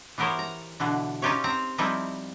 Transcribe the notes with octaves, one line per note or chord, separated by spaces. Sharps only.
E3 B3 G4 A#4 C5 C#5
A#5
B2 D3 E3
C#4 D#4 F4 G4 B4 C#5
C4 A#5
F3 G3 C4 D#4 E4